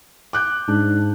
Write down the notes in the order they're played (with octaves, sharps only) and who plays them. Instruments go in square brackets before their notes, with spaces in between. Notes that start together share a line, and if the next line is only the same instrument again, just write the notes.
[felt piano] D6 F#6 G6
[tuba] G#2 [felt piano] D4